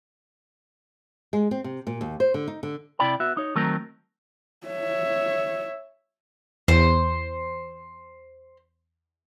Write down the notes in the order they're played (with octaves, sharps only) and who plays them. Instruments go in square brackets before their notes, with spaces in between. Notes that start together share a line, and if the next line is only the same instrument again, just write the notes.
[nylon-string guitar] G#3
C4
C3
A#2
D#2
C5
D3
D#4
D3
[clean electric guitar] C3 E4 D5 G5 B5
B3 F#4 E5
D#4 C#5
D#3 F#3 A3 C4 A#4
[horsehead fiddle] C#5 E5
[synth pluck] E2 [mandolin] C5